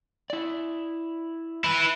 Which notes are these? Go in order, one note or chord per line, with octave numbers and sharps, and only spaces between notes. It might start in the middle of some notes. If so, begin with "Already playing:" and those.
E4 D5
E4 B4